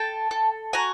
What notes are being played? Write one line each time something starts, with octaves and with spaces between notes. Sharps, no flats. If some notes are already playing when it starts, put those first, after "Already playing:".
Already playing: A4 G5 A5
A4
F#4 G#5 A#5